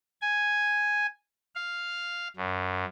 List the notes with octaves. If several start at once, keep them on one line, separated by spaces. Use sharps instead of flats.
G#5
F5
F#2